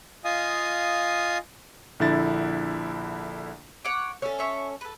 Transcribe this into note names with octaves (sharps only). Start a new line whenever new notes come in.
F4 D#5 F5 G#5 D#6
A#1 D3 E4 A6
C#5 F#5 D6
C#4 A4 E5 F6
C#5 E5 C#6
A4 B4